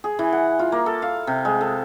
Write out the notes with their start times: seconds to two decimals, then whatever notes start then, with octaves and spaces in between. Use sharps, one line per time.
0.04 G#4
0.19 E3
0.33 F#5
0.59 F4
0.72 A#3
0.86 A4
1.02 F5
1.27 C3
1.45 G#3
1.61 A4